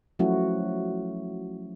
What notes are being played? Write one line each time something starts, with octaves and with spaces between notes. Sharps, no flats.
F3 F#3 A3 C#4 E4 F#4